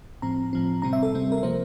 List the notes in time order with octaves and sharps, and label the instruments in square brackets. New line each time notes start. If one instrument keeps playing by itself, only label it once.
[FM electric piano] A2 F3 C4 A#5
A2 F3 C4
C3 G3 C4 A#5
E5
A4
C3 G3 C4
A#4
C3 F3 A#3 C5